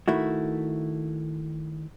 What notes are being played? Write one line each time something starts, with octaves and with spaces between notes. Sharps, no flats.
D#3 A3 E4 F#4